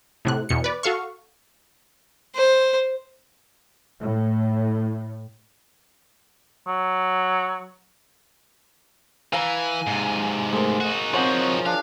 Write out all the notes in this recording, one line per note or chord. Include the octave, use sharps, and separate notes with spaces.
A2 C3 F#6
E2 B2 C#7
B4 D5
F#4 A4 F5 C#6
C5
A2
F#3
E3 F5 G#5 A#5
G#2 C3
A3 G#4 A#4 C5
D#4 F#4
C4 F4 C5 C#5 F#5 G#5
D4 F5